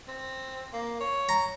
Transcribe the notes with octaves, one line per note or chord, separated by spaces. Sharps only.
C4
A#3
C#5
A#5